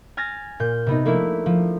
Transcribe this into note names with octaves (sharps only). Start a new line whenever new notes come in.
G#5 F6 A6 A#6
A#2 G6
C3 B3 D#4
F3 A3 A#3 D4 E4
F3